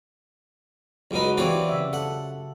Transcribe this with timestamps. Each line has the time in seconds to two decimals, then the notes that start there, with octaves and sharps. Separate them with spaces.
1.11 C#2 C#3 F#3 D#4 F#4 B4
1.37 E3 C4 F4 G4 C#5 D5
1.69 C#3 E5
1.93 A4 F#5